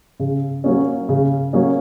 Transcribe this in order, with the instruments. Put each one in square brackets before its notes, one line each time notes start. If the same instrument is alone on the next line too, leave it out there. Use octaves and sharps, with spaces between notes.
[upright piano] C#3
F#3 A#3 C#4
C#3
F#3 A#3 C#4